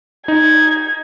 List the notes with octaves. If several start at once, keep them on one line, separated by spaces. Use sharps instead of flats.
D#4 G#6